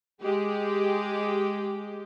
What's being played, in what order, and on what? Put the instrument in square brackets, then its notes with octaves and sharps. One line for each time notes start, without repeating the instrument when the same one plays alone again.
[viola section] G#3 G4